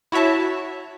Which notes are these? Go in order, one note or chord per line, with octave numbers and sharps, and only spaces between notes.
E4 F#4 C#5 E5 A5